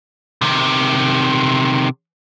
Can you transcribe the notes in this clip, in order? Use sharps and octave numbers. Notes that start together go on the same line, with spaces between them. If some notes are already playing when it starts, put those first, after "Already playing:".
C3 D#3